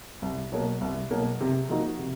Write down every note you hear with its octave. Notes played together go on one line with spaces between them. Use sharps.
C2
B2 F#3 A#3
C2
B2 F#3 A#3
C3
F3 A#3 D#4 F#4
C3